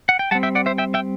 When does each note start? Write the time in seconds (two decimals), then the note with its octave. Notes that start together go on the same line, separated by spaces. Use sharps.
0.09 F#5
0.19 G5
0.31 G3 F#5 A5
0.35 C4
0.43 E5 G5
0.55 D5 F#5
0.66 C5 E5
0.78 E5 G5
0.94 E5 G5